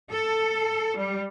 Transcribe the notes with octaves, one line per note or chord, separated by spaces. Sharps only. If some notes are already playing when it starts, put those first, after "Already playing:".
A4
G3